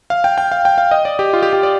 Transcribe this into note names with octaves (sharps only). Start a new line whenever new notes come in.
F5
G5
G5
F5
G5
F5
D#5
D5
G4
F4
G4
G4
D5